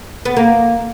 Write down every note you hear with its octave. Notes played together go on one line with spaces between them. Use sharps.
B3
A#3